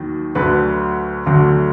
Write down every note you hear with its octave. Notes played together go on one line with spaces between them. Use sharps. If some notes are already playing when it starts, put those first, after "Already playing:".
Already playing: D#2 D#3 F#3
D2 D3 F#3 B4
D2 D3 F#3